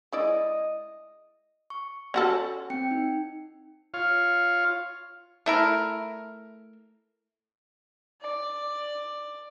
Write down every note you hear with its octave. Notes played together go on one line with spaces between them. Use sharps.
G#3 E4 D5 D#5
C#6
C#4 F#4 A4
C4 G5 C#7
D#4
F4 C#5 F5
A3 E4 A#4
D5